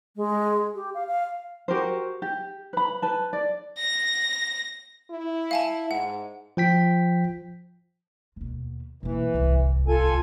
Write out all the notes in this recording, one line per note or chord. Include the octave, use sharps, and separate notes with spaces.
G#3
G4
F5
F5
F#4 G4 A#4 C5
G4
B4 B5
B4 A5
D5
A#6
E4
F5 G#5 A5
G#2 F#5
F3 G5 B6
D#2 B2
B2 E3 A#3
D1 C2
F4 A4 G#5